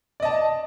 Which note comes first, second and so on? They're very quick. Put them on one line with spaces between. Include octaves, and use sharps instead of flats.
D5 D#5 A5